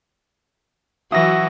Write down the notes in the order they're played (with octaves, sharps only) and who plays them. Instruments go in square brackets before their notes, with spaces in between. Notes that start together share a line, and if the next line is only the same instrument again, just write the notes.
[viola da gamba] E3 F#3 [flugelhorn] F#4 [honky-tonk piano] E5 E6 [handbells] D#6 A#6